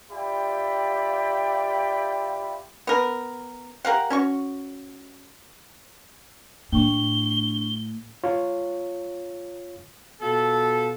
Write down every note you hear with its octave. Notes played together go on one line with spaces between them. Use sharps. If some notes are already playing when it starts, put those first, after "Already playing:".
F4 G4 D5 E5 G5 B5
B3 A#4
G4 A#4 F5 F#5
C#4 F#4 C#6
A2 D4 C#6 G7
F4 C#5
B2 F4 A4